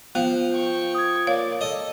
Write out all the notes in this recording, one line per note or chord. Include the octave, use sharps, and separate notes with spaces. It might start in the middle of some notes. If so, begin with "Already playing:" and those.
F3 B3
G5 C#6
D#6 G#6
A#3 C#5 D5 F5
A4 D#5